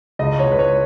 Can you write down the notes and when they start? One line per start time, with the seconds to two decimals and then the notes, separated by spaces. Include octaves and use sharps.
0.19 C#2 D#5
0.39 C#5
0.46 C#2
0.52 B4
0.59 C#5